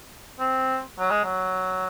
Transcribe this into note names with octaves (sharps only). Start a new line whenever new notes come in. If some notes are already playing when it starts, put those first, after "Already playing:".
C4
F#3
G#3
F#3